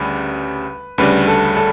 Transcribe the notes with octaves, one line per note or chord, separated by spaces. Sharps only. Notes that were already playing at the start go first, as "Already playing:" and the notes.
Already playing: D2 C#3 G3 B4
D2 C#3 G3 D4 B4
A4
A4